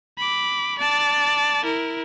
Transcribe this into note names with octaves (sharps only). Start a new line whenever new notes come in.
B5 D6
D5 A5
E4 A#4